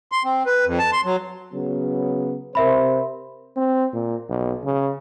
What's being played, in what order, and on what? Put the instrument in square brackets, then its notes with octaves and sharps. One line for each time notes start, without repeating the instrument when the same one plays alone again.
[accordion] C6
C4
B4
F2
A5
C6
F#3
[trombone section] C#3 F#3 B3
[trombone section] C3 C5 [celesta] A#4 E5 B5
[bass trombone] C4
A#2
B1
C#3